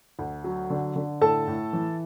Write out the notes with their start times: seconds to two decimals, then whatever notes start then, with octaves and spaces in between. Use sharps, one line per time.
0.19 D2
0.44 F#3
0.70 D3
0.96 D3
1.21 A2 A4 A5
1.47 A2
1.73 E3